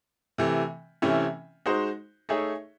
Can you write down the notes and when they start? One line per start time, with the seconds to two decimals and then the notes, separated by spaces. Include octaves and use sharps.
0.38 C3 E3 A3
1.02 C3 E3 A3 C#4 E4
1.66 G#3 D#4 F#4 C5
2.29 A3 D#4 G#4 C#5 E5